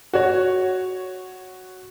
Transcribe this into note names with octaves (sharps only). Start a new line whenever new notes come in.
F#4 C#5